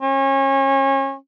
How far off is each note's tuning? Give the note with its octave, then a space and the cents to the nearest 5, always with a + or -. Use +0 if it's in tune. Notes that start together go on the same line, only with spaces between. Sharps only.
C#4 -30